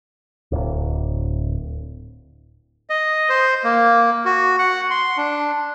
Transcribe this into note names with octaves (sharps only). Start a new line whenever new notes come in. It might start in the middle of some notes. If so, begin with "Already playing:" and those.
D1
D#5
C5
A#3
F#4
F#5
C6
D4